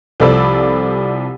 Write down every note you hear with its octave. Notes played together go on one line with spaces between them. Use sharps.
C2 F3 A4 D5 B5 E6